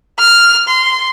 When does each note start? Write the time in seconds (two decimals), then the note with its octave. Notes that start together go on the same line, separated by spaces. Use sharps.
0.19 F6
0.68 C6